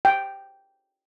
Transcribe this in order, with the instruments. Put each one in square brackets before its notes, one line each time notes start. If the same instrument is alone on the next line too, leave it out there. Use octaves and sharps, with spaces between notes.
[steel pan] G5